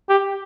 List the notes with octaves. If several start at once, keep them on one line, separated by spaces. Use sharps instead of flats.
G4